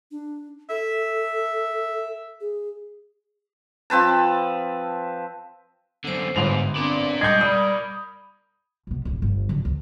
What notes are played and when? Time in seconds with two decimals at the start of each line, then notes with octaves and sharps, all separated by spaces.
0.11 D4
0.70 A4 E5
2.41 G#4
3.90 F3 C4 B4 A5
6.05 F#2 D3 B3 C5
6.36 G1 G#2 F7
6.76 C4 D4 A#4 D5
7.21 G3 G#3 D#5 G6 G#6
7.41 G3 B5 D#6
8.87 B1 B2
9.05 D1 A1
9.22 G1
9.49 D3 F#3
9.65 D2